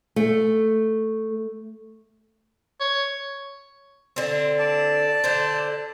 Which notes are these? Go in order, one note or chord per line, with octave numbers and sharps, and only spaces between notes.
A3
C#5
D3 C4
D5 A5
D3 C5